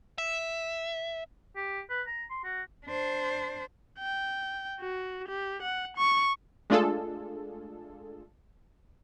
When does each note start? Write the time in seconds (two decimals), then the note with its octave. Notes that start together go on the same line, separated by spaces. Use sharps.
0.18 E5
1.56 G4
1.90 B4
2.07 A#5
2.31 C6
2.44 F#4
2.86 D4 C5
3.99 G5
4.80 F#4
5.28 G4
5.62 F#5
5.97 C#6
6.70 G#3 A3 D4 F4 G#4 A4